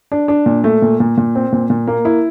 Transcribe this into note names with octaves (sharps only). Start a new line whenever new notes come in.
D4
D4
A#2
A3
A#2
A#2
A#2
C4
A#2
A#2
A#3
E4